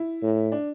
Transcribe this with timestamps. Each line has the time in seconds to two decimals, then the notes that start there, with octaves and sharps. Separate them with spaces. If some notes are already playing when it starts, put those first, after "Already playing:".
Already playing: E4
0.22 A2
0.52 D4